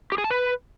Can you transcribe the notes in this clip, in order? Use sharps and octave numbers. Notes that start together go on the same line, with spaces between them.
G4
G#4
A5
B4